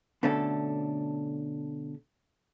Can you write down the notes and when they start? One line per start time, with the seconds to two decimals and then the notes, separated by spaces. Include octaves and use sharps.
0.23 B2 D3 A3 C#4 D4 A4